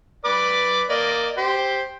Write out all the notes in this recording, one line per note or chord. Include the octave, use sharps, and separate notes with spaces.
B4 D5 D6
A#3 D5 D#5
G4 C5